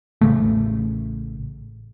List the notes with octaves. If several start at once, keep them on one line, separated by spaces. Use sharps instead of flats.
A1 C#3 A3